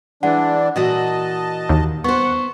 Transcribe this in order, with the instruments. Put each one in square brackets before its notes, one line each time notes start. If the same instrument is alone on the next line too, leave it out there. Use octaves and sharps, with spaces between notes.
[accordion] E3 D4 [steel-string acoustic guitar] G#3 [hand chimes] F#5
[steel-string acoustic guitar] A#2 E3 F#4 [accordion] D#5 A5
[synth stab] D#2
[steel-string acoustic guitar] B3 C5 [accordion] F#5 [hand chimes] C#6